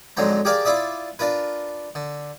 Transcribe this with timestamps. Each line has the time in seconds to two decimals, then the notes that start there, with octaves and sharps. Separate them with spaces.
0.17 F2 G#2 D3 F#3 C5 A#5
0.45 G4 G#4 A#4 D5 F5
0.65 E4 F4 D5 E5 D#6
1.19 D4 F4 A#4 B4
1.95 D3